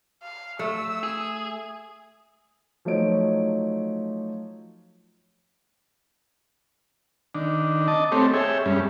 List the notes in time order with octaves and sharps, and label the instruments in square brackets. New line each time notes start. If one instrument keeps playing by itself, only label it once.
[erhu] F5
[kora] A3 [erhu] E6
[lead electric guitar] G#4
[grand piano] F3 F#3 A3 D#4 C#5 D7
[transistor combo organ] D#3 D4
D#5 A5 D6
A3 C4 G4 A4 C#5
G#4 C#5 E5 G5
G2 G3 C#4